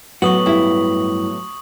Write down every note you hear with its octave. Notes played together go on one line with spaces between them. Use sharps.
A2 F#3 B3 F#4 C#6 D#6 F#7
G2 E4